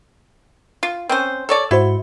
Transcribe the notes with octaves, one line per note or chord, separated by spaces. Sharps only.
F4
C4 C#4 C5
A4 C#5 D5
G#2 E4 F#4 C5